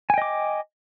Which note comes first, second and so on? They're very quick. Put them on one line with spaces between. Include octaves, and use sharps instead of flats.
G#5 G5 D#5 D6